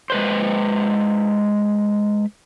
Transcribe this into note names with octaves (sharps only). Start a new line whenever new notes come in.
G#3 B4 C5